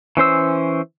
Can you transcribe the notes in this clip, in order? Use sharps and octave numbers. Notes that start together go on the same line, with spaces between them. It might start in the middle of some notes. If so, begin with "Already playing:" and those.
E3 C#4 C5 E6